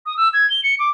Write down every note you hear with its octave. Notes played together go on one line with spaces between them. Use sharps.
D#6
E6
G#6
G7
C#7
D6